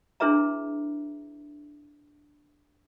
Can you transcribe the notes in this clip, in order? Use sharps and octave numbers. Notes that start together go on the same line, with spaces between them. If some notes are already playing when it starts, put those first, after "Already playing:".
D4 E4 G#4 B4 E5 A#5